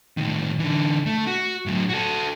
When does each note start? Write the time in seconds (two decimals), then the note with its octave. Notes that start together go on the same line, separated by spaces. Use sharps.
0.17 A2 D#3
0.59 D3 E3
1.06 A3
1.27 F#4
1.66 A2 F#3
1.89 F#4 A4